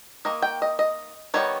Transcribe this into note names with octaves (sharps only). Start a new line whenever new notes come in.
D#3 A#3 D#5
G5
D#5
D#5
D#3 G3 B3 C#5